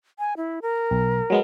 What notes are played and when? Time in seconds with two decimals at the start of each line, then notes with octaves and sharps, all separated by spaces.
0.19 G#5
0.37 E4
0.62 A#4
0.91 B1
1.30 F#3 G#3 B3